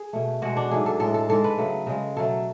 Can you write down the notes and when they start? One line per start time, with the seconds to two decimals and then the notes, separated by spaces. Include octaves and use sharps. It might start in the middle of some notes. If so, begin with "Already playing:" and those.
Already playing: G#4
0.13 B2 A3
0.42 B2 G#3 F#4
0.57 D4
0.71 G#2 F#3 A3 G#4
0.86 A4
1.00 A2 G#3 A4
1.14 A4
1.29 G#2 G#3 A4
1.44 B4
1.57 C#3 F#3 A3
1.87 C#3 G#3
2.17 B2 F#3 A3 A4